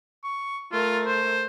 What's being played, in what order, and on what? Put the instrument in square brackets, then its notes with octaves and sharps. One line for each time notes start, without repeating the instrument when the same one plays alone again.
[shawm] C#6
[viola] A3 A#4 [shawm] F4
[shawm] C5